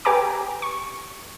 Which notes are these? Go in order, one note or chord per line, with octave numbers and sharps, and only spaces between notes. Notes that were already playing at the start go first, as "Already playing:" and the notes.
G4 B4 G#5 A#5 D6
C#6